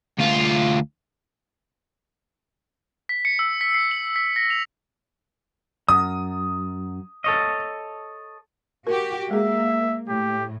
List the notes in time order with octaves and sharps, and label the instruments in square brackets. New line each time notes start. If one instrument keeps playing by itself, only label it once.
[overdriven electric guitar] D2 F4
[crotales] B6
C#7
E6
B6
C7
F#7
B6
A#6
F7
[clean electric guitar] F#2 [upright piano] D#6
[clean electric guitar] A4 C#5 D#5
[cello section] F#4 G4 [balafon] A#4
[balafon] G#3 G#4 [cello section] A#3 [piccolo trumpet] E5
[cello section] A2 [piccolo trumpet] G4